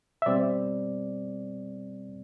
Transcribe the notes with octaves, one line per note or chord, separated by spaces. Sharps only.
E5
B2 G3 C4 D5